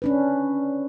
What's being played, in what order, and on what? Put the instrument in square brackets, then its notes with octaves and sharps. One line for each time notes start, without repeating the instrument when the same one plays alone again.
[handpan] C#4 D4 B4